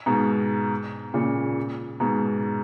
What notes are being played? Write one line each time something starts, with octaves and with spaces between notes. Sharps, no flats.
G#2 B2
A#2 C#3
G#2 B2